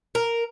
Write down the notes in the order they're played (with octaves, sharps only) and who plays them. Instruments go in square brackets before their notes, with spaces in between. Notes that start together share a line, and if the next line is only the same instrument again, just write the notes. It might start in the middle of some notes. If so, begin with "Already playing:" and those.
[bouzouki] A#4